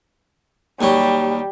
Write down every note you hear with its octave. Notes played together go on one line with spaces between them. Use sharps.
D#2 F#3 G3